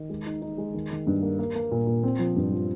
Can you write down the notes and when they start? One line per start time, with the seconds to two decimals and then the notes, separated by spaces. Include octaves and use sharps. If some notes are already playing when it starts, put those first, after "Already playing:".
Already playing: D#3
0.10 G#3
0.26 D#4
0.42 D#4
0.58 G#3
0.74 D#3
0.91 D#3
1.07 G2
1.22 A#3
1.39 A#3
1.55 A#3
1.71 A#2
1.87 A#2
2.03 C4
2.19 F3
2.36 G2
2.52 F3